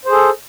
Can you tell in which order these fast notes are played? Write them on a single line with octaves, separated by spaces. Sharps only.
C5 G#4 A4